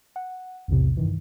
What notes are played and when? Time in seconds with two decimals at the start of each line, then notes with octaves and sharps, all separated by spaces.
0.16 F#5
0.68 B1 E2 A2 C3
0.97 G2 D#3 E3